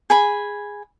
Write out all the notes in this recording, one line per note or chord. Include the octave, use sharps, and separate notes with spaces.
G#4 G#5 B5